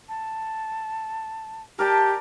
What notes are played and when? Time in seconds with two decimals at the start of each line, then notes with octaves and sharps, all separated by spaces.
0.09 A5
1.79 G4 A#4 D5 A5